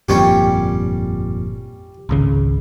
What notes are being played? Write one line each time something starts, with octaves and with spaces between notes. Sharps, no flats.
G1 F2 A#2 G3 C#4 G4
G#1 C#2 C#3